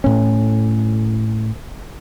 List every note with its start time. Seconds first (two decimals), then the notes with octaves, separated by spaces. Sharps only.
0.04 A2 C#4